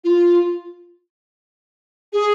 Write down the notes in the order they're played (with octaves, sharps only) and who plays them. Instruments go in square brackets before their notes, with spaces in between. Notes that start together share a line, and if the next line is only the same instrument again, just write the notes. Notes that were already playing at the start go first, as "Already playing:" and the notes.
[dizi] F4
G#4